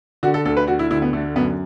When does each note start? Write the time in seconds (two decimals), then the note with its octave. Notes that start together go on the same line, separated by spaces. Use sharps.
0.23 D3 F#4
0.34 A4
0.45 D2 A4
0.57 B4
0.67 D3 F#4
0.79 E4
0.91 D2 E4
1.02 B3
1.13 D3 A3
1.36 F#2 B3